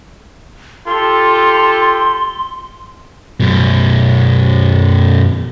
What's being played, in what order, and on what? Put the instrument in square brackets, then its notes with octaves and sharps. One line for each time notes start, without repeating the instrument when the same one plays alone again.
[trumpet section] F4 G4 A4 [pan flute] C6
[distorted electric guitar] F#2 B2